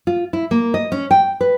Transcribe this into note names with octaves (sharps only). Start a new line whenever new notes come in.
F4
E4
A#3
D#5
C#4
G5
B4